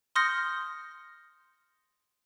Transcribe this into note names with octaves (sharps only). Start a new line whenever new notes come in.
C6 D#6 F6 G6 A#6 C#7